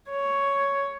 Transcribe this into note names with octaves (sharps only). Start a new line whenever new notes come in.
C#5